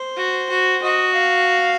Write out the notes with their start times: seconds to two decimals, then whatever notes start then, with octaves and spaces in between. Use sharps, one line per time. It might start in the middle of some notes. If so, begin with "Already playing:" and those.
Already playing: C5
0.17 F#4
0.50 F#4
0.82 F#4 D#5
1.13 F5